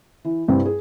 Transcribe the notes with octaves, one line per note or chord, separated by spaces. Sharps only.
E3
C2 G2 C4
G#4